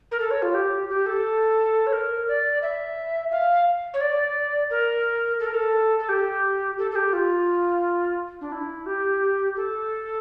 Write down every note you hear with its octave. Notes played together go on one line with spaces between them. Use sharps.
A#4
A4
C#5
F4
G4
G4
A4
C#5
A#4
D5
E5
F5
C#5
D5
A#4
A4
A#4
A4
A4
G4
A4
A4
G4
F4
D4
E4
G4
A4